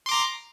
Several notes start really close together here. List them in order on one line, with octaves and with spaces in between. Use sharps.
C6 D6 A#5